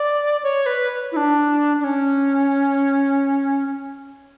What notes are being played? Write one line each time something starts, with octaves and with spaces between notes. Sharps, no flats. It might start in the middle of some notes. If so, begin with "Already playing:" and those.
Already playing: D5
C#5
B4
E4
D4
D4
C#4